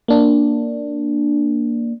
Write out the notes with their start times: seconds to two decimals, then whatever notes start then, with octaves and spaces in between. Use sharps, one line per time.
0.08 A#3 D4